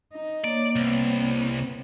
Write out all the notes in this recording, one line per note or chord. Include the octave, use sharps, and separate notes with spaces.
D#4
A#3 C#5 D5
C2 B3 C4